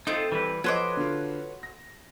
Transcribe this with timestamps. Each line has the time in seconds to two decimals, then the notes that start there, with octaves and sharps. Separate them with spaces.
0.07 A3 C4 D#4 F4
0.32 E3 G3 B4
0.64 F3 F#4 A4 B4 C#5 D#5 C6 D6
0.97 D3 F4
1.63 A#6